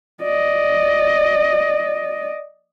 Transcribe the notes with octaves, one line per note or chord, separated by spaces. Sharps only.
D5 D#5